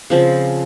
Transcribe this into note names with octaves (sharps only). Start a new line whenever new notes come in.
C#3 F3 C4